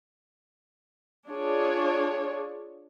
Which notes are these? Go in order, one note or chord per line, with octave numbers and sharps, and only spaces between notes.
D4 F4 G#4 C#5